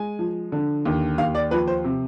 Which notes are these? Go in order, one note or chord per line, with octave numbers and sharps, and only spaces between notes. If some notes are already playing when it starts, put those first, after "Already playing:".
Already playing: G#3 G#5
F3
D3
D#2
D#2 F5
D5
F3 B4
C5
C3